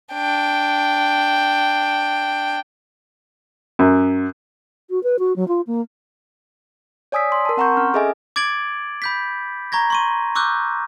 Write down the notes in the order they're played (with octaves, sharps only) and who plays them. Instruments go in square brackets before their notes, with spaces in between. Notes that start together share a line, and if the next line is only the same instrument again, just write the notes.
[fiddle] D4 G5
[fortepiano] F#2
[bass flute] F#4
B4
F#4
F#3
F4
A#3
[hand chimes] C#5 D5 G#5 D#6 E6 B6
C6
A#4 A5
C4 F#5 A#5 C6 C#6 G6
C#4 F6
G#4 A4 D#5 E5 G#5
[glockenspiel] D6 G#6 A6 D7 F#7
B5 G6 B6
A#5 C#6 G#6 A#6
C6 C#6 D#7
C#6 D6 E6 F#6 G6